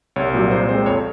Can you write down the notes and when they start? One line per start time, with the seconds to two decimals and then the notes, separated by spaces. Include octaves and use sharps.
0.16 C2 C#5
0.34 A#2 F#3
0.51 A#2 C5
0.69 G#3 C4 C5
0.86 F2 C#5